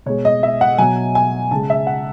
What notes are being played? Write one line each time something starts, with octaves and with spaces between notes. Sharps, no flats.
B2 G#3 C#5
D#5
E5
F#5
B2 F#3 G#5
G#5
C#3 G#3 A5
E5
F#5